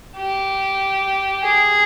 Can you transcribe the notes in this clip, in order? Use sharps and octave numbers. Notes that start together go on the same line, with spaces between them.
G4
G#4